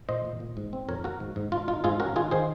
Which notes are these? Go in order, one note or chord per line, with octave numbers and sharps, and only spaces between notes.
A#2 C5 D#5
A#2
A#2
G#2
C4
F2 A#4 C#5
A#3 F#4 A#4
G#2
G#2
G#2 F4
D#4 F4
G#2 F4 G#4
C#4 F#4 A#4
D#3 F4 G#4
D#3 G#4 C5